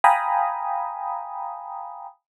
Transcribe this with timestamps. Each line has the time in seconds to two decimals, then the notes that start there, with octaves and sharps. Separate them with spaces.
0.04 F5 G5 G#5 A#5 B5 D#6